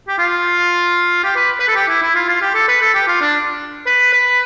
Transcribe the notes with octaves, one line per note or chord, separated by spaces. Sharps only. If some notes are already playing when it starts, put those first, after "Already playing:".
G4
F4
G4
B4
B4
A4
G4
E4
E4
F4
F4
G4
A4
B4
A4
G4
F4
D4
B4
B4